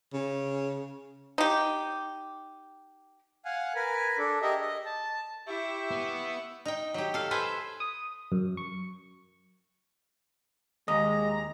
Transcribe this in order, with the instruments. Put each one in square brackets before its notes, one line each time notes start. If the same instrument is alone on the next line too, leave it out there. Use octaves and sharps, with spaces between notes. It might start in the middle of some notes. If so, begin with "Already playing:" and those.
[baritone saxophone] C#3
[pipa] D#4 G4
[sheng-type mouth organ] F5 F#5 G#5
A#4 B4 G#5
D4 A4
G4 G#4 A#4 D#5 E5
D#5
A5
[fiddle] E4 [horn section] G4 [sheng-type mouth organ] E5 C#6
[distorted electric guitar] B3
[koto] D#4 G5
F#3 G4
A4 F5
A4 B4 C5 E5 G#5
[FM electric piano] D#6
F#2
C#6
[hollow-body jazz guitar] D#2 [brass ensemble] G#3 [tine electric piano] D#5 [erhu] A#5